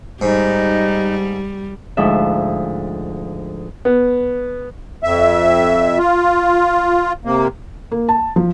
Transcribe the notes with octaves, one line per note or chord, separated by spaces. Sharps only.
G#2 G3 D#4
D2 G#2 F3 E5
B3
F2 E5
F4
C3 A#3
A#3
A5
F3